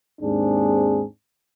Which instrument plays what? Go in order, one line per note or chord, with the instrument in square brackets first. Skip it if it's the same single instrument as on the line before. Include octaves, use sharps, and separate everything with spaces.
[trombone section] D#2 G#2 C4 D4 G#4